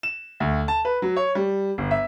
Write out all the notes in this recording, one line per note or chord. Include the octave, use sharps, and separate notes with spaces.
E7
D2
A5
B4
F#3
C#5
G3
G1
E5